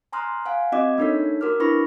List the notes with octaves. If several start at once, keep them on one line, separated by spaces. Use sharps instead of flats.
G#5 A#5 C6 D#6 F6 F#6
F5 F#5 G#5
C4 F#4 D#5 D6 D#6 G#6
A#3 D4 D#4 A4 C#5 B6
F#4 A#4 D6 F6
D4 E4 B4 B5 C#6 A#6